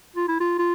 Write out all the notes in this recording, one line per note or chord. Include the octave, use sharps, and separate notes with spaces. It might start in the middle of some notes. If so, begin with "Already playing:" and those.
F4
E4
F4
F4